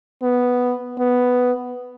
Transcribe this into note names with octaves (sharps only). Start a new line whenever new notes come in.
B3
B3